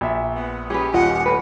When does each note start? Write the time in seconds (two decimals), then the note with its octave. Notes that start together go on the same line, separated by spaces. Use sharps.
0.01 A#1 E5
0.35 B3
0.70 C#4 G4 G#4 B4
0.94 D#1 F4 D#5 F#5
1.26 A2 B4